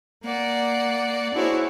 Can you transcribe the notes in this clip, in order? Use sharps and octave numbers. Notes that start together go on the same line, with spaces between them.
A#3 D5 F#5
D4 E4 F#4 G#4 C5 C#5